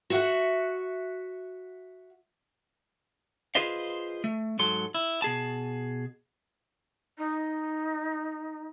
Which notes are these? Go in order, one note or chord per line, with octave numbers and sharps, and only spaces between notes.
F#4 E5 F#5
F4 G#4 B4 C5 D#5 F5
A3
G#2 F#3 A4 C6
E4
B2 G#4 A5
D#4